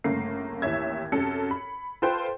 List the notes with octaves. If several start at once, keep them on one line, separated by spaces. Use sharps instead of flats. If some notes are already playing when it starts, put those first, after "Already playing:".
G1 C#3 A3 A#3 C7
A1 D#2 E4 C#5 E5 G#6
F#2 C3 A4 C#7
B5
F4 A4 B4 C5 G5 C6